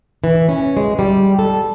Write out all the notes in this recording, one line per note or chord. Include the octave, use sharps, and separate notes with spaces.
E3
C#4
G#3
G3
A4